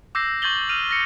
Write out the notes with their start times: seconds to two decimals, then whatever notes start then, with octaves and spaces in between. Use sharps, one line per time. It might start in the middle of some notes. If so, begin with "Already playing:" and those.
0.15 D6 E6 G6 A#6 C7
0.42 C#6 G6 A6 F#7 G7
0.69 F6 D#7 F7
0.89 F6 A#6 C#7